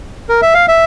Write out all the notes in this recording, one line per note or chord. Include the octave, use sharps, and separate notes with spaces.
A#4
E5
F5
E5